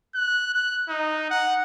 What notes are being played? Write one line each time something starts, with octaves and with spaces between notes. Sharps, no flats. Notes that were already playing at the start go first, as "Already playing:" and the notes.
F#6
F#6
D#4
F#5